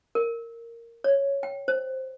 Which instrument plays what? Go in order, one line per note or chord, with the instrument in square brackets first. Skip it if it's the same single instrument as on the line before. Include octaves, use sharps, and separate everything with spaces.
[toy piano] A#4
C#5
G5
C5